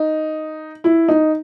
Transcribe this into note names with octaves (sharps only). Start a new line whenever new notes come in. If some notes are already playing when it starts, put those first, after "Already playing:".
Already playing: D#4
E4
D#4